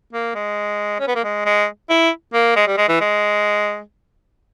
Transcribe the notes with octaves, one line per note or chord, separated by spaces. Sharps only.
A#3
G#3
C#4
B3
A#3
G#3
G#3
E4
A#3
G#3
G3
G#3
E3
G#3